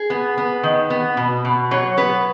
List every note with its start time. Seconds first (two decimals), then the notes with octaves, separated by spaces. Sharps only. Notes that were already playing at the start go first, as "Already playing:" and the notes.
Already playing: G#4
0.10 B3
0.38 B3
0.63 D#3
0.90 B3
1.17 B2
1.45 B2
1.71 F#3 C#5
1.97 B3 B4